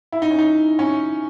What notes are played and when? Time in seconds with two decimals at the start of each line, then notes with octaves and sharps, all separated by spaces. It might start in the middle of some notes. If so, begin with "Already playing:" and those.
0.12 E4
0.22 D#4
0.31 C#4
0.39 D#4
0.79 C#4